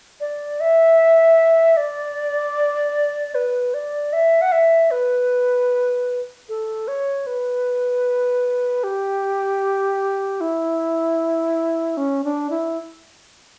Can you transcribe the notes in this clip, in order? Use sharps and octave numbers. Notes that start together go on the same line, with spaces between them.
D5
E5
D5
B4
D5
E5
F#5
E5
B4
A4
C#5
B4
G4
E4
C#4
D4
E4